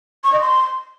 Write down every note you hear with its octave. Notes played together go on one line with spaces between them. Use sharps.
C#6
D#5
C6